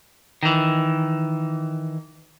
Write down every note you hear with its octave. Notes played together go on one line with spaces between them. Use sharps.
D#3 E3